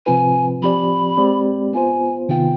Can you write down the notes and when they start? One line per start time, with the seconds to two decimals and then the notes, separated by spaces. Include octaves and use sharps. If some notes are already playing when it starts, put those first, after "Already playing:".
0.06 C3 F3 C4 F4 B4 G#5
0.62 F3 C4 G4 D5 B5
1.17 G#3 C4 G4 D5
1.73 B3 F4 C5 G#5
2.29 C3 D#3 B3 F4 G5